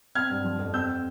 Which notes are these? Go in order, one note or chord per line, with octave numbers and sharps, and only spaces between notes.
C4 F6 G#6
G2
F3
F2
C4 E6 G6